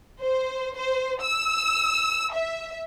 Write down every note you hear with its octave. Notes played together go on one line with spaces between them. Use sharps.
C5
C5
E6
E5